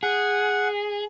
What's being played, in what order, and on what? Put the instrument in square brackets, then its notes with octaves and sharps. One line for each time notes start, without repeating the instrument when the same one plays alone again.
[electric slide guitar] G#4 [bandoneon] F#5